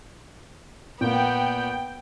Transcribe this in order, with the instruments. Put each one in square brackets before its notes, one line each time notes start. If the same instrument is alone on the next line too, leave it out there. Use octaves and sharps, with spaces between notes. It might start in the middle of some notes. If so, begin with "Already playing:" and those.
[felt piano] A#2 A#3 [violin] B3 [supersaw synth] G5